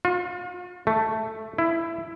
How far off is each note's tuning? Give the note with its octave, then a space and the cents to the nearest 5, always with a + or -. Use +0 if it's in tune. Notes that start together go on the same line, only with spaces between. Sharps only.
F4 +40
A3 +0
E4 +10